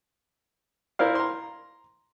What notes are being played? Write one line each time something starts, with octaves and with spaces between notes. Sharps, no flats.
E4 A#4 C5 D5 F5
A#5 C6